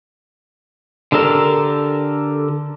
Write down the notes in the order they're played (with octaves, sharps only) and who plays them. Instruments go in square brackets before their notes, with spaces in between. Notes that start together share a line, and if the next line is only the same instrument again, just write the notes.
[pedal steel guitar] D3 G4 A4 A#4